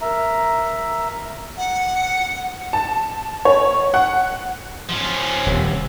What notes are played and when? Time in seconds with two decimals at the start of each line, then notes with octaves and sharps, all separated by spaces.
0.02 A#4 E5 A#5
1.57 F#5
2.73 A5
3.45 C#5
3.94 F#5
4.89 F3 C#4
5.46 D#1 C3